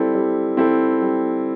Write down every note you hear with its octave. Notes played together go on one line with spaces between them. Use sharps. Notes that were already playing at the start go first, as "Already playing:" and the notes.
Already playing: G3 C4 E4 A4
G3
C4 E4 A4
G3